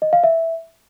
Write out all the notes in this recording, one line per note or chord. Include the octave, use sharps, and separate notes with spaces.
D#5
F5
E5